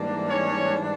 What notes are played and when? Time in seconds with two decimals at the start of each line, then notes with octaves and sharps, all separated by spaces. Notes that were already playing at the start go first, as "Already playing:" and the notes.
Already playing: G#2 E3 G3 A#3 D4
0.28 C#4 C#5